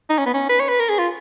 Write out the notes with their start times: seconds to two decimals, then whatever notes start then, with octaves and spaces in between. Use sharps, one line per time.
0.10 D#4
0.18 C#4
0.26 B3
0.34 C#4
0.49 B4
0.60 C#5
0.69 B4
0.80 A#4
0.89 G#4
0.99 F4